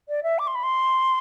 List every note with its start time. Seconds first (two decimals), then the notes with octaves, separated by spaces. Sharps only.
0.08 D5
0.23 E5
0.38 D6
0.47 C6
0.55 B5
0.63 C6